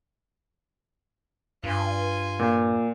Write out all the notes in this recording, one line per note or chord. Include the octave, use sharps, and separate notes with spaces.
G2 F4 G#5
A#2